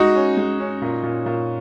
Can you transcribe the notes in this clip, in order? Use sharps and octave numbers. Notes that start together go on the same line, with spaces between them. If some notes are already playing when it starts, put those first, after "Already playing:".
Already playing: G#3 D#4 F#4
C#4
G#3
C#4
A#2
A#2
A#2